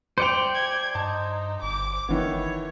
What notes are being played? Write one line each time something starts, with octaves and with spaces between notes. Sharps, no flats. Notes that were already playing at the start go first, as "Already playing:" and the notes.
C5 D5 G5 C#7 F7
G#6
G2 D#4 A5
G1 D6
F#1 D#3 E3 B3 C#5